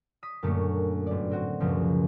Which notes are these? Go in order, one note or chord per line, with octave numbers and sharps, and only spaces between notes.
D#6 B6
F#2 A#2 D3 A3 A#3
G1 D5
A2 C4 F#4
C#2 F#2 B2 F3